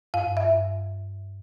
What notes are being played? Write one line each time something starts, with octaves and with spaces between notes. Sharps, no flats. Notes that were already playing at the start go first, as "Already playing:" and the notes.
G2 F5
E5
G2